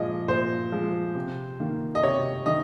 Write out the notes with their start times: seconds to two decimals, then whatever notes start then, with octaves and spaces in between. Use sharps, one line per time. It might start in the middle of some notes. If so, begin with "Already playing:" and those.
Already playing: A#2 F3 G#3 D#5
0.28 A#2 C5
0.72 F3 G#3
1.15 C3
1.60 D#3 A#3
1.95 D#5
2.03 C3 C#5
2.46 D#3 D#5